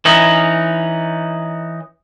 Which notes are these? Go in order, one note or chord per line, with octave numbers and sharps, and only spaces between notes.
E3 C#4 D#4